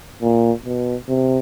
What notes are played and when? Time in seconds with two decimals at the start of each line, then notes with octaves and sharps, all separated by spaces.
0.22 A#2
0.65 B2
1.09 C3